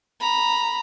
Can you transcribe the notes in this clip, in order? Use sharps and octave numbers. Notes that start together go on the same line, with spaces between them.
A#5 B5